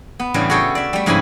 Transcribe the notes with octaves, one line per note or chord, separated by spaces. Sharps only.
B3
A2 C#3 E3 G3 D4
F#4 G#4 A4 C#5 G5
D5 E5
G3 A3
F2 G#2 C#3 E4 G#5 B5